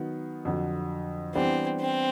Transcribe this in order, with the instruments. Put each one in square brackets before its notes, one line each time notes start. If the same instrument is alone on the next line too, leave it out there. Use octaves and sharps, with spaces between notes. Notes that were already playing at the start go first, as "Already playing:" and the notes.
Already playing: [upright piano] D#3 F#3 B3
F2 D3 F#3
[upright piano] E3 G3 B3 D4 [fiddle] C4
[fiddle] C4